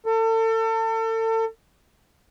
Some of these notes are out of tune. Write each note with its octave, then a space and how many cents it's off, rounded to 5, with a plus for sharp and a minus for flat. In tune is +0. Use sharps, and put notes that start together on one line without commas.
A4 +35